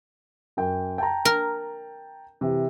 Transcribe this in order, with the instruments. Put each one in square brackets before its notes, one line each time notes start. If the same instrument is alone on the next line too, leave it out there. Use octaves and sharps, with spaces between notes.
[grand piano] F#2 G5
G5 A5 A#5
[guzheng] A#4
[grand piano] C3 E3